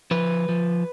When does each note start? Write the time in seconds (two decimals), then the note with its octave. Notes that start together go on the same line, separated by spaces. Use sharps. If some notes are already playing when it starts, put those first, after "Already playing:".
0.11 F3 B4
0.49 F3